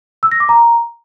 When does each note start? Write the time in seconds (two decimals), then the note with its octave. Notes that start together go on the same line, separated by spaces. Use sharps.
0.23 E6
0.32 A#6
0.40 D6
0.49 A#5